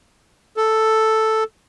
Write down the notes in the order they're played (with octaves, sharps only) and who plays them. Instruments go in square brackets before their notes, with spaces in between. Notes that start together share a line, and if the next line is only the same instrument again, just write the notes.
[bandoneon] A4